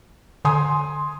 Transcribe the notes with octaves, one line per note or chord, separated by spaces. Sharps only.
D3 G#5 C6 D#6